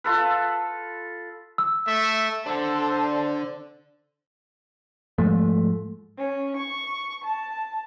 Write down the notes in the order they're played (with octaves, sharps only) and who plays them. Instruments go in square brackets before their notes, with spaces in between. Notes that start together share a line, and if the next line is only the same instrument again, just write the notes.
[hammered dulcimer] F4 A4 B4
[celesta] E6
[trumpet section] A3 E5
[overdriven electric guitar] D3 D4 [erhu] A4 [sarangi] C5
[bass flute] D5
[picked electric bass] G#2 F3 G#3 A3
[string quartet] C#4
C#6
A5